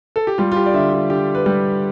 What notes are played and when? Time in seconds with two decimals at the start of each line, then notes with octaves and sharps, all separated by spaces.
0.16 A4
0.27 G4
0.38 G3 F4
0.52 F4
0.57 G4
0.66 D5
0.74 D3 E5
0.93 F4
1.10 D3 G4
1.35 B4
1.46 G3